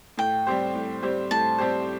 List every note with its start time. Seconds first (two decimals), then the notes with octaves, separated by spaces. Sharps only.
0.18 A2 G5
0.47 G3 C4 G4 C5
0.75 A2
1.02 G3 C4 G4 C5
1.31 A2 A5
1.58 G3 C4 G4 C5